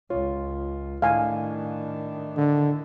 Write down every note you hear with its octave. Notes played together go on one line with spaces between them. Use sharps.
C#2 F4 C#5
A2 D#3 D4 F5 G#5
D3